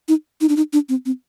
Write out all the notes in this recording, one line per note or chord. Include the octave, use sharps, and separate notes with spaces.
D#4
D#4
D4
D#4
D4
C4
C4